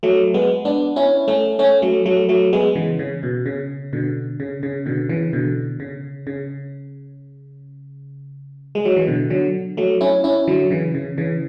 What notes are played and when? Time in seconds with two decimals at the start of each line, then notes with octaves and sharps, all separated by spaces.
0.03 F#3 A3
0.34 G#3 B3
0.65 B3 D4
0.96 C#4 E4
1.28 A3 C#4
1.59 A3 C#4
1.82 F#3 A3
2.05 F#3 A3
2.29 F#3 A3
2.53 G#3 B3
2.75 C#3 E3
2.99 C#3
3.23 B2
3.46 C#3
3.93 B2 D3
4.40 C#3
4.63 C#3
4.86 B2 D3
5.09 C#3 E3
5.33 B2 D3
5.80 C#3
6.27 C#3
8.75 G#3
8.85 F#3
8.96 E3
9.07 B2 D3
9.30 D3 F#3
9.77 F#3 A3
10.01 C#4 E4
10.24 C#4 E4
10.47 D3 F#3
10.71 C#3 E3
10.95 C#3
11.18 C#3 E3